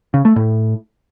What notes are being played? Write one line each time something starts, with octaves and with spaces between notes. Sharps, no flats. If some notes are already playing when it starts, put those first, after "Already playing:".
C#3
A3
A2